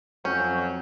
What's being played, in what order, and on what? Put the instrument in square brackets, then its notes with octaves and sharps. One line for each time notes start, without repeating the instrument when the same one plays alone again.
[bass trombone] F2 [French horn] F#3 [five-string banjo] C#4 [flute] G6